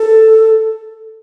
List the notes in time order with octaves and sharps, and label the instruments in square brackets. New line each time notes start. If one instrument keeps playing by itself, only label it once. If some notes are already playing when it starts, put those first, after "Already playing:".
Already playing: [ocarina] A4